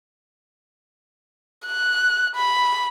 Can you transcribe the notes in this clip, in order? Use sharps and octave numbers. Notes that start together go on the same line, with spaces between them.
F#6
B5